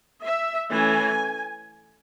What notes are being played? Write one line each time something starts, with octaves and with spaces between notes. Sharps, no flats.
E5
E3 A3 C#4 G#5